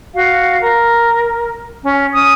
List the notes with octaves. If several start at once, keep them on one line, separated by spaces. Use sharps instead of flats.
F#4 F5
A#4
C#4
C#4 D#6